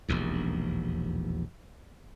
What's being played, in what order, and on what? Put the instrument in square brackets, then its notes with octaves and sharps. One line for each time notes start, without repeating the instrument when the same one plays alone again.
[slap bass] E1 A#1 D#2